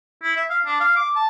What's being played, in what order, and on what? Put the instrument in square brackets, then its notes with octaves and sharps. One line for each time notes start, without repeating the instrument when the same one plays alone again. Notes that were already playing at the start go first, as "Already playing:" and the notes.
[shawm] E4
E5
F5
D4
F5
D6
A5